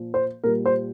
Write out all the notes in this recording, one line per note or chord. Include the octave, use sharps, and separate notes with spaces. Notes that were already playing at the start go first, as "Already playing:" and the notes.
Already playing: A#2 F3
C5
A#2 G3 A#4
C5